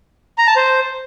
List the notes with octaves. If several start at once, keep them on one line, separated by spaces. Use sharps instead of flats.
A#5
A5
C5